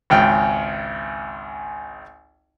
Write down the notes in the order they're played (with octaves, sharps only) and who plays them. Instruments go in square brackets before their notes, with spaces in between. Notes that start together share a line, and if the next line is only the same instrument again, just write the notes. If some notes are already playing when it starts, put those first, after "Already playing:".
[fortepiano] G#1 C#2 G5 F6